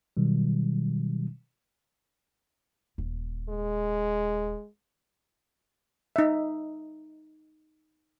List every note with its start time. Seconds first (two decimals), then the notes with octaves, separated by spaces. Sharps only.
0.17 B2 D#3 F#3 G3
2.98 D#1
3.49 G#3
6.16 D#4 E5